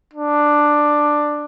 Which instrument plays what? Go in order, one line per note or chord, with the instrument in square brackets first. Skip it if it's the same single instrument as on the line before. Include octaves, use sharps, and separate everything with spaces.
[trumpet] D4